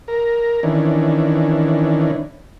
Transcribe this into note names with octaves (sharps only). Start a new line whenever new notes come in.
A#4
D#3 E3 C#4 D4